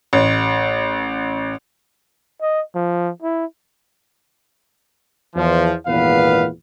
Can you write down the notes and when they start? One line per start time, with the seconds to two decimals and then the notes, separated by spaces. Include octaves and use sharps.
0.13 A1
2.42 D#5
2.75 F3
3.22 E4
5.35 E2 F3
5.87 G#1 E2 A#2 B3 B4 F5